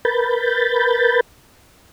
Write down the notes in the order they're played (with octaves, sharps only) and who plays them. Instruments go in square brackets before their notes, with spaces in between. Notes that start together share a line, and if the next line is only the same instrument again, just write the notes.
[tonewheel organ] A#4 B4 B5 G6 A6